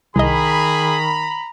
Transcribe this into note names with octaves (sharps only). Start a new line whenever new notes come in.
C2 D#3 G#4 D#5 A#5 B5